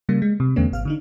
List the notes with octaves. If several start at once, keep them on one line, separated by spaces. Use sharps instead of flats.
C#3 G3 A#3
G#3
C3
E2 D3 A3 B3 C#4
G#1 F5 F6
D3 D4 D#4